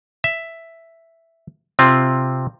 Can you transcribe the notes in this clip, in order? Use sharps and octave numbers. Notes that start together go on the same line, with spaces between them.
E5
C3 C4 F4